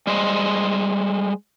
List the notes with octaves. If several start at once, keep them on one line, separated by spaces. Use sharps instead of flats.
G3 G#3 C5 D#5